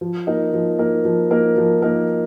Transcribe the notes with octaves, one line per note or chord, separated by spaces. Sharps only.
F3
A#3 D#4 A#4
F3
A#3 D#4 A#4
F3
A#3 D#4 A#4
F3
A#3 D#4 A#4